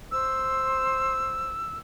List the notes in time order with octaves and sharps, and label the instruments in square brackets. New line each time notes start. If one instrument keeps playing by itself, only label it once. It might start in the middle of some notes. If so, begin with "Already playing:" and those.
[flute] C5 [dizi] E6